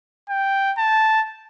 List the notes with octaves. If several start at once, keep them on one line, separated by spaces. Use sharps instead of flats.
G5
A5